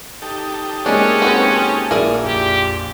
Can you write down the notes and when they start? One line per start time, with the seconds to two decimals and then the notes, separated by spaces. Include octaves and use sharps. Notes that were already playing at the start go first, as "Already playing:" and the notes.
0.22 D#4 G4 A4
0.86 G#3 A#3 C#4 D4 G#4
1.22 C4 F#4 B4
1.91 A#1 E4 G#4 A#4 D5
2.24 F2 G4